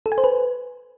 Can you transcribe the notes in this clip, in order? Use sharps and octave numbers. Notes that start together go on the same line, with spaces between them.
A4
G#5
C5
B4